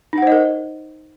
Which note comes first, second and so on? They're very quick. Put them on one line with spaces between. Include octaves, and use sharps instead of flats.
D#4 F#5 C5 D#5 A#4